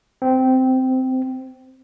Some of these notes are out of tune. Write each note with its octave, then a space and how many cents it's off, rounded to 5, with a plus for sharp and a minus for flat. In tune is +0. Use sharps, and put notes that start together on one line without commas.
C4 -15